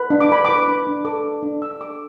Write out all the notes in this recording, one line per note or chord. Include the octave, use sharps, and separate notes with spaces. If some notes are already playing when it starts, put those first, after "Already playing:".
Already playing: B4
D4
D6
B4 B5
B4 D6
D4
D4
A4 D6
D4
D4
D4 E6
A4 D6